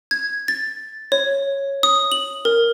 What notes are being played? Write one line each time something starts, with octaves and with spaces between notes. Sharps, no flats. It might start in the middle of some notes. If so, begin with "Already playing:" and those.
G#6
A6
C#5
D#6
F#7
A#4